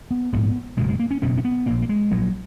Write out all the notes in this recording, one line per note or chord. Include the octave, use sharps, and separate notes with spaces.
B3
A#1 G#2 B3
F#1 E2 B2 G#3
G#3
A#3
C#4
F#1 E2 B2 C#4
C#4
B3
A#1 A#2 A#3
A#3
G#3
A#1 A#2 F#3